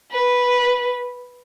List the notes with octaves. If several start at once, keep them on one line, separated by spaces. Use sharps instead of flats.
B4